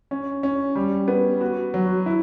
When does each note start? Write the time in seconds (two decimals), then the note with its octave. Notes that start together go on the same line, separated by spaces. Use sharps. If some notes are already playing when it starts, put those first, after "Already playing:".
0.11 C#4
0.43 C#4
0.76 G3
1.08 B3
1.41 F#4
1.74 F#3
2.06 E4